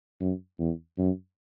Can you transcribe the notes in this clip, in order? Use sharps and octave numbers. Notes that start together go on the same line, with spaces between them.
F#2
E2
F#2